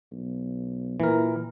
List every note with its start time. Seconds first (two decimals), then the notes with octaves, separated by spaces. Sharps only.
0.12 B1
1.00 A#2 E3 A#4